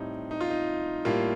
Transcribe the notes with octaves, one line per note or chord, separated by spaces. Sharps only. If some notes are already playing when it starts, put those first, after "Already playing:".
Already playing: A2 G3 C4 D#4
D#4
F4
D#4
A2 G3 A#3 F4